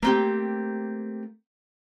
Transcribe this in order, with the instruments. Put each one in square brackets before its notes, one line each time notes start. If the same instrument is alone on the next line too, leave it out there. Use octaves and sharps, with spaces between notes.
[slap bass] A3 [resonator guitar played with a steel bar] A#3 C4 G4